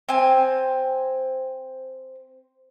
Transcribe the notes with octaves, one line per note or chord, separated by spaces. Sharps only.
C4 G#5